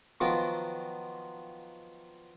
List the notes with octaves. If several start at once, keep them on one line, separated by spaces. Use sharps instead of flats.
D#3 F3 F#3 B3 F4 A#4